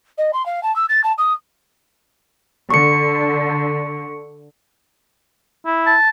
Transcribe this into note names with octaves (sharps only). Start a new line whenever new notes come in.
D#5
C6
F5
A5
E6
A6
A5
D#6
D3 C#6 C#7
E4
A5